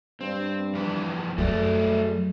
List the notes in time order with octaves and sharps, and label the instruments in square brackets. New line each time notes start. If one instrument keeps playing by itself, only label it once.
[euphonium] G2 [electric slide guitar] C4
[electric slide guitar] F2 E3 B4
[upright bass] F#2 F#3 [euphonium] A3 [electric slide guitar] F#4 G#4 D5